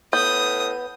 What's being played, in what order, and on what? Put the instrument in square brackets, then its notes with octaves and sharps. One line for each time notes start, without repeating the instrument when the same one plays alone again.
[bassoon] A2 [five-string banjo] B3 [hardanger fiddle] D#6 [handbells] G6